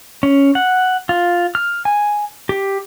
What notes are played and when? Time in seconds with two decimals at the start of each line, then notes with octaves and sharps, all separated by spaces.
0.23 C#4
0.55 F#5
1.09 F4
1.55 F6
1.85 G#5
2.49 G4